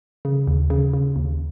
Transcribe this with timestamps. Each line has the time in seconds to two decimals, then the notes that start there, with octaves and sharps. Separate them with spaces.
0.25 C#3
0.47 D#2
0.70 C#3
0.93 C#3
1.16 D#2